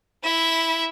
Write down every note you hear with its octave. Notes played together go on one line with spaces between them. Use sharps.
E4 E5